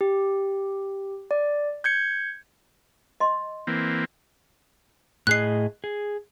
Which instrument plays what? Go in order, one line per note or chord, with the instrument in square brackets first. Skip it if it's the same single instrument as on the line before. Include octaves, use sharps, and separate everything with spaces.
[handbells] G4
D5
G6 G#6 C#7
[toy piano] D#5 C6
[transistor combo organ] E3 A#3 C4
[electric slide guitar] A2 G#4 D#5 [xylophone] F#6 C7
[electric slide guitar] G#4